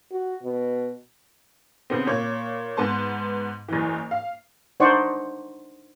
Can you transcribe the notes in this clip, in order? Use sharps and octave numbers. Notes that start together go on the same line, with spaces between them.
F#4
B2
C#3 B3 C4
A#2 C#5
G#2 B3 A5 C6
F#1 E3
F5
D4 D#4 C5 D5 F#5 C#6